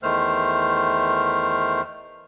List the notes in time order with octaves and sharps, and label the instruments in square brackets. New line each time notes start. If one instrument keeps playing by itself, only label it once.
[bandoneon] E2 D#3 A3 C5 F6